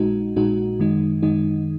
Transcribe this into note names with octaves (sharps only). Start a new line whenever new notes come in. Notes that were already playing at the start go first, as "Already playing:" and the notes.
Already playing: A#1 A#2 G#3 D#4 F#4
A#1 A#2 G#3 D#4 F#4
F#2 D#3 G#3 D#4
F#2 D#3 G#3 D#4